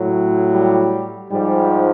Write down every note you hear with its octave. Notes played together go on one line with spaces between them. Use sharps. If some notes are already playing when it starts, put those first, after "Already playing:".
Already playing: A2 F#3
G3
G#2 F3 G3